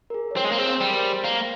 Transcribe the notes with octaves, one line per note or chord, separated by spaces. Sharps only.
A#4
G#4
C#5
C4 C5
G#3
A#3 A#4
C4 G#4
C5
G3 C5
A#3